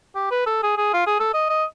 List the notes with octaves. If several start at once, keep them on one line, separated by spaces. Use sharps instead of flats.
G4
B4
A4
G#4
G#4
F4
G#4
A4
D#5
D#5